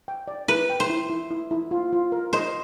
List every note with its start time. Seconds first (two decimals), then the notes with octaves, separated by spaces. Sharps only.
0.08 G5
0.28 D5
0.48 E4 B4
0.70 G5
0.80 C5
0.90 E4
1.10 E4
1.31 E4
1.51 E4
1.71 F4
1.93 F4
2.12 A#4
2.33 C5 D#5